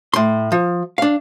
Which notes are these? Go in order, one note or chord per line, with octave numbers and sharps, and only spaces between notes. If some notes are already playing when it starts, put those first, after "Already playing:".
A2 C6
F3
D4 F5